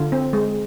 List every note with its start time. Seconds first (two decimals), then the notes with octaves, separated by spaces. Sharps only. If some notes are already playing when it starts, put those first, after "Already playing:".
Already playing: D3 F4
0.12 C4
0.33 G#3